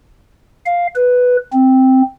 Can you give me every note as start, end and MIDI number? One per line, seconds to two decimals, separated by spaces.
0.66 0.87 77
0.96 1.37 71
1.53 2.02 60